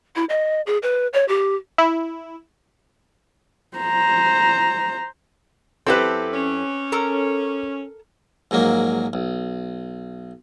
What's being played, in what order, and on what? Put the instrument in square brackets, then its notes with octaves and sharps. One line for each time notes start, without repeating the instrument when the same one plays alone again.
[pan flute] E4
D#5
G#4
B4
C#5
G4
[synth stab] E4
[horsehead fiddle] C5 A#5
[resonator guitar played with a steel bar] F#2 E4 A4 [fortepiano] C4 G4 B4
[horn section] C#4
[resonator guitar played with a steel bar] A4 A#4 A#5
[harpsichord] A#1 G#2 F#3 A#3
B1